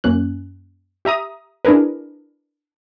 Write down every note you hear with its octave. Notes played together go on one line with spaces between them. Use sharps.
F#2 A#3 C#4 F#6
G4 E5 A#5 D#6
D4 E4 G#4 A#4 B4